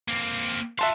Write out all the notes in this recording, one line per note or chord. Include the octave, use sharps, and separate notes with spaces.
A#3 C4
F#4 E5 F5 A5 C6